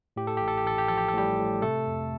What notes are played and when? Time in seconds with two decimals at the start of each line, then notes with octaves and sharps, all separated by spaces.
0.16 A2 G4
0.27 A4
0.37 A1 G4
0.48 A4
0.57 G4
0.65 A1 A4
0.78 G4
0.88 F3 A4
0.98 G4
1.09 A4
1.14 A2 G3 G4
1.39 A2
1.62 C3 A3 A4
1.87 F2